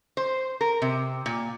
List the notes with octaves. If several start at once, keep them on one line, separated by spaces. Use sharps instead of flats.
C5
A#4
C3
A#2